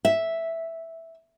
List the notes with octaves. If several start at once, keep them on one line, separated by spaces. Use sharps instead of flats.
E5